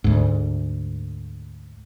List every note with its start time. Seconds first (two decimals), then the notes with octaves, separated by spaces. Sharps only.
0.04 D2 G#2